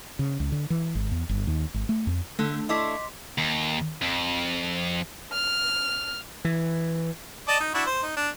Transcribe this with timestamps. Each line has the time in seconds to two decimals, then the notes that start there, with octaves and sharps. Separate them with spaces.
0.19 C#3
0.40 C#2
0.52 D3
0.70 E3
0.95 G#1
1.12 E2
1.29 G1
1.47 D#2
1.74 G#1
1.89 A3
2.07 F2
2.39 D3 A3
2.69 A3 D4 E4 D#5 C6 D6 B6
3.38 D#2
4.02 F2
5.32 F6
6.45 E3
7.48 D5 D#5 A5
7.60 D#4
7.74 D4 E4 F#4
7.86 C5
8.02 D#4
8.16 D4